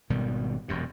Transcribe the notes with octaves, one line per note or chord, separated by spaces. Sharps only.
G#1 B2 D#3 G3
E1 F#2 C3